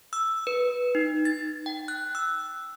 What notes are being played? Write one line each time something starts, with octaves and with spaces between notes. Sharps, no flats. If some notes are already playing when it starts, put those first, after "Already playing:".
E6
B4
D#4
A6
G5
F#6
E6